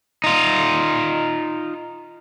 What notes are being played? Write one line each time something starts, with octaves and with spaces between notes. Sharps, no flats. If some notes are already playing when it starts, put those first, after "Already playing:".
D#4 F4